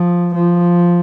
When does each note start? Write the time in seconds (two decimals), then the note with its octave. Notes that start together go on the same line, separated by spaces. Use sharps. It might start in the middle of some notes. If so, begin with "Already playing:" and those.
Already playing: F3
0.34 F3